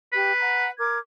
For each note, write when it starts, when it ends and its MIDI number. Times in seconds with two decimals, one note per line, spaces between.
0.13 0.31 67
0.13 0.68 71
0.40 0.69 78
0.40 0.69 82
0.78 0.97 70
0.78 0.97 86
0.78 0.97 92